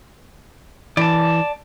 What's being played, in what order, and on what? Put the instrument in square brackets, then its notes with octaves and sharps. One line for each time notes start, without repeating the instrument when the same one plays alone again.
[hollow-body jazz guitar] E3 [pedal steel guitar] D5 A5